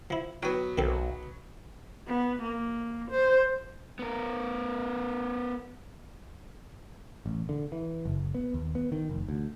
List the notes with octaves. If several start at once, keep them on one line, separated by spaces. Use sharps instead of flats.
F3 E4
F#3 B3 G5 G#5
B1 D#3 C4 A4
B3
A#3
C5
B3 A#4
A1
D3
E3
F#1
B3
D#2
B3
D#3
F1
D2